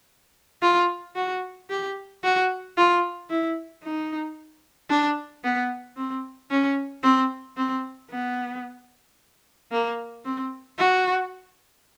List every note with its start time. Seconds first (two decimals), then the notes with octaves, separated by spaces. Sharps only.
0.62 F4
1.15 F#4
1.70 G4
2.23 F#4
2.77 F4
3.30 E4
3.83 D#4
4.89 D4
5.44 B3
5.97 C4
6.51 C#4
7.03 C4
7.57 C4
8.10 B3
9.71 A#3
10.24 C4
10.79 F#4